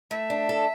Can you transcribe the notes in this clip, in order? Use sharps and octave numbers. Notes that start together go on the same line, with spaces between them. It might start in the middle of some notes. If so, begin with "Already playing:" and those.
A3 E5
D4
A4